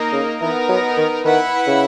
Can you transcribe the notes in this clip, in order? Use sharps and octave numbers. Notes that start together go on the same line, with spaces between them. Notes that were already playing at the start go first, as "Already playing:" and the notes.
Already playing: A#3 D#4 A#4 D#5
C#3
E3 B3 D#4 A#4
F#3
D#3
D#3 E4 B4 F#5
C#3